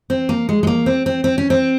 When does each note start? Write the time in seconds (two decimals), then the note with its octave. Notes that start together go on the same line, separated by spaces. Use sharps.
0.10 C4
0.29 A#3
0.49 G#3
0.63 G#3
0.67 A#3
0.86 C4
1.06 C4
1.24 C4
1.38 C#4
1.50 C4